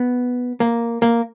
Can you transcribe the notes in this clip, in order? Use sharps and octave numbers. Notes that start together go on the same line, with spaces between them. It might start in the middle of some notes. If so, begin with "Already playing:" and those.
Already playing: B3
A#3
A#3